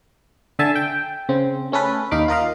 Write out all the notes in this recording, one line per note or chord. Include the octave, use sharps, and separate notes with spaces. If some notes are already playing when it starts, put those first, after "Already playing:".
D3 E5 G#5 A5
G5
C#3 C4
A3 C#4 A4 B4
D#2 D#4 F5 B5 D6
F4 A#4 D#5 F5